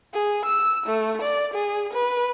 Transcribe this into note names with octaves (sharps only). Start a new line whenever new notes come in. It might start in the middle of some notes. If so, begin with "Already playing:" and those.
G#4
E6
A3
D5
G#4
B4